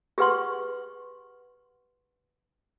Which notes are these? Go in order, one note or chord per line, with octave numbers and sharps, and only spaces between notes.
G4 G#4 B4 F#5 C6 C#6